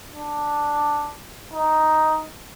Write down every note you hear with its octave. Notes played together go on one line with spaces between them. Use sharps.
D4
D#4